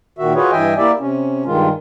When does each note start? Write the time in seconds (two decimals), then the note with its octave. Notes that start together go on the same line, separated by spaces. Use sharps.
0.19 A#2 D#3 F#4 E5
0.35 F4 F#4 G#4 B4 C#5
0.52 G2 E3 D#5 E5 G5 G#5
0.78 A#3 E4 G4 D5 E5
1.00 C3 C#4
1.46 G2 D#3 G#3 F4